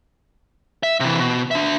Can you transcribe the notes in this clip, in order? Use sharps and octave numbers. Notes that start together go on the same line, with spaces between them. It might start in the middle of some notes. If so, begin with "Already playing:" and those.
E5
C3 E3
B2
D4 E5